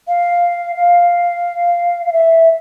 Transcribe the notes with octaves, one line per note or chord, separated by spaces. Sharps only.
F5
F5
F5
E5